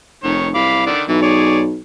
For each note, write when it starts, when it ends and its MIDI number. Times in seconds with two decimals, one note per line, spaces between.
0.23 0.52 29
0.23 0.48 51
0.23 0.48 73
0.55 0.89 36
0.55 0.82 77
0.55 0.82 83
0.55 0.82 86
0.86 1.03 50
0.86 1.03 51
0.86 1.03 74
1.08 1.78 35
1.08 1.17 52
1.22 1.60 68
1.22 1.60 73
1.22 1.60 74